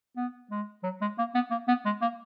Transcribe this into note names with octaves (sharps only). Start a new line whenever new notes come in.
B3
G#3
F#3
G#3
A#3
B3
A#3
B3
G#3
A#3